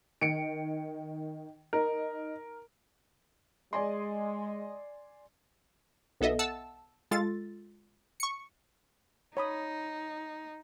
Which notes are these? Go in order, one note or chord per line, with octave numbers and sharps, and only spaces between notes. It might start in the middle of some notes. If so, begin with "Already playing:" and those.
D#3 C#7 D7
D#4 A#4
G#3 D5 D#5 G#5 C6
B1 B3 A4 D#5 E5
F#5 A5 E6
G#3 F4 A4 A6
C#6 C#7
D#4 C#5 B5 D#6